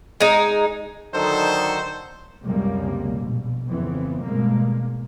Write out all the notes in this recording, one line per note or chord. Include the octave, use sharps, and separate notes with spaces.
G#3 D#4
D3 D#3 F#3 D#4 A4 C5
C#2 F#2 C3 G3 A#3
A#1 B2
G#1 F2 C#3 E3 B3 C4
G#1 G2 B2 G#3 A#3